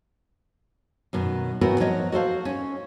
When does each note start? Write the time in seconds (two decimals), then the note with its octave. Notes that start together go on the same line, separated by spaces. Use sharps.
1.13 F#2 B2 D#3
1.61 A2 E3 B3 C4 F#4 A#4
1.80 F3 F#3 C#5 D#5
2.12 F#4 A4 C5 F5
2.45 C#4